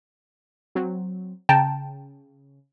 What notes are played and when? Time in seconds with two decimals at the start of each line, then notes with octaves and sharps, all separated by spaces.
0.75 F#3 C4
1.49 C#3 G5 A5 A#5